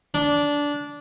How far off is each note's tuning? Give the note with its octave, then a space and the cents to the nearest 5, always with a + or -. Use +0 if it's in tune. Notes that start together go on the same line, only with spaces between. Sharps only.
D4 -15